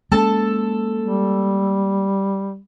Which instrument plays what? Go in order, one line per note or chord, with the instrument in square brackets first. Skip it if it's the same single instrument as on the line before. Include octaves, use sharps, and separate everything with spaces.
[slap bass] G#3 A#3 C#4 [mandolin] A4 A5
[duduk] G3